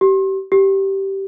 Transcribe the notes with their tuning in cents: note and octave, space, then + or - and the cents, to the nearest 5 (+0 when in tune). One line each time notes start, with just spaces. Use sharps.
G4 -30
G4 -15